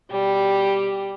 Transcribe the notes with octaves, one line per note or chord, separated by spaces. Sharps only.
B2 G3 G4